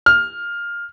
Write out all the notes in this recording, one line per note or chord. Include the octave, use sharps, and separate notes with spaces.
F6